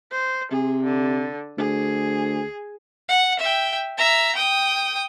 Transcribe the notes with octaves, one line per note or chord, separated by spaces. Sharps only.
C5
C3 G#4
D3
D2 G#4
F#5
E5 G5
E5 A#5
G5 D#6